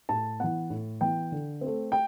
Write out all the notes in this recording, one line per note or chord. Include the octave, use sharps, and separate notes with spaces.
A2 A5
E3 B3 F#5
A2
E3 B3 G5
D3
C4
A3
G5